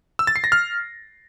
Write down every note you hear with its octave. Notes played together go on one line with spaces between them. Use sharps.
E6
A6
C7
A#6
F6